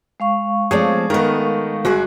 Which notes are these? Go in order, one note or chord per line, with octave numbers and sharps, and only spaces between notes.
G#3 F5 C#6
F3 A3 C4 G#4 C#5 D5
D#3 A3 B3 A#4 D#5
G1 F#4 G#4 D5